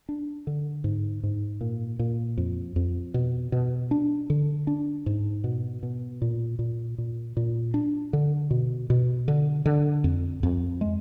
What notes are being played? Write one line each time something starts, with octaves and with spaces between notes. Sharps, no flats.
D4
D3
G#2
G#2
A#2
A#2
F2
F2
B2
B2
D4
D3
D4
G#2
B2
B2
A#2
A#2
A#2
A#2
D4
D3
B2
B2
D3
D3
F2
F2
G#3